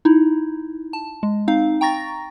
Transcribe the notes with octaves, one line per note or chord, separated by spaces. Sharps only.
D#4 E4
A5
G#3
C4 D#4 F5
G5 A#5 C#6 A6 A#6